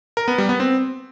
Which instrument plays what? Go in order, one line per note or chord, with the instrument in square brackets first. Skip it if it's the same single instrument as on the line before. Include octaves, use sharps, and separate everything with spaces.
[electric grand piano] A#4
B3
G3
B3
C4